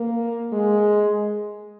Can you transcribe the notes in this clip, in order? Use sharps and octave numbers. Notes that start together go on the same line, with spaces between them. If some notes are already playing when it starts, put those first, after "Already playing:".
Already playing: A#3
G#3